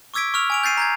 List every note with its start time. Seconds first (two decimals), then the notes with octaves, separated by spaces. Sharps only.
0.14 C#6 D6 E6 G#6 B6 D7
0.34 C#6 E6 F6 F7
0.50 G#5 D7 F7
0.63 G6 A6 C7 D#7
0.77 A#5 G6 G#6